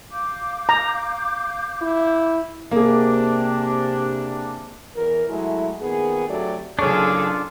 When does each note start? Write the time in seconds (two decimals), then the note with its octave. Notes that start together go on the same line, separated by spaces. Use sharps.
0.10 F5 D6 G6
0.69 A#5
1.82 E4
2.71 C3 A#3 D4 G#4
4.96 E2 A#4
5.28 F#3 G#3 A3 E4
5.81 A#2 D#3 B3 G#4
6.29 D3 F#3 A3 C4 G4 D5
6.79 F#1 D4 F4 G#4 A4 C#5 C#6